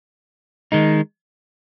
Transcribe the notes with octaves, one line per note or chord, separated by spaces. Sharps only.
D#3 G#3 D#4